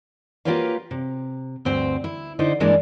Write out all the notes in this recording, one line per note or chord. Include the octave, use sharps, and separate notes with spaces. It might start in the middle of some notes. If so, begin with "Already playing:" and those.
A#3 F4 G4 B4 C#5 F5
C3
D2 G2 C4 C5 G5
E4
D3 D#4 E4 C5
G2 E3 G#3 A#3 D4